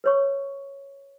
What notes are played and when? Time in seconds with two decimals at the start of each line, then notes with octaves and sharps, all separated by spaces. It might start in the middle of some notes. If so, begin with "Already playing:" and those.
0.04 B4 C#5 C#6